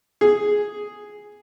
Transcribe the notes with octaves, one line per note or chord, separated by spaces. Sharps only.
G#4